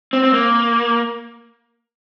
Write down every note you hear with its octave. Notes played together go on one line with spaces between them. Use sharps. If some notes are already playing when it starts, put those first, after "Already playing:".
C4
C4
A#3